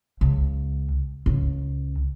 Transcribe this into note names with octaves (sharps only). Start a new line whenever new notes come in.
C#2
C#2